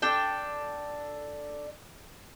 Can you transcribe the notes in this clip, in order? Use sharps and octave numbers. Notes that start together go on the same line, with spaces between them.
D4 A4 G5